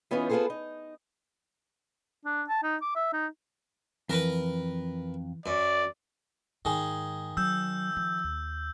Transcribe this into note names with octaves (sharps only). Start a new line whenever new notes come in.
E3 B3 C#4 D#4 F4
B3 F4 F#4 G#4 A4 C5
D#4
D4
A5
D#4
D6
E5
D#4
F2 E3 A#4 B4
F#2 D5
G#2 D#3 G#4
F#3 E6 G6
F3
D#2